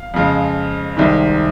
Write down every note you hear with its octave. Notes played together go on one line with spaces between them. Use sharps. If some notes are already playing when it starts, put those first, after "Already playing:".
Already playing: F5
F2 C#3 G#3
C2 C3 D#3 G#3